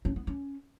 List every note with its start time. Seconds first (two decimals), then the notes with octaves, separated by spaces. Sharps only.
0.05 C#4
0.16 B3
0.27 C#4